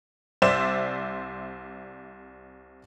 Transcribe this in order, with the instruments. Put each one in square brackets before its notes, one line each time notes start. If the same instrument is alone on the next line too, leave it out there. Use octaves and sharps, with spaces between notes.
[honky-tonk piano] C2 C5 D5 E5 E7